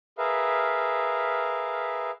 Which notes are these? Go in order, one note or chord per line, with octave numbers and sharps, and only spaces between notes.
G#4 A#4 B4 E5 F5